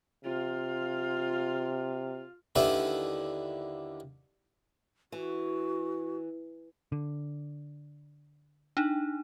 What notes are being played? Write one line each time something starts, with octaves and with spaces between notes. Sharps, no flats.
C3 F4 F5
D#2 D3 E4 B4
E3 F#4
D3
D4 D#4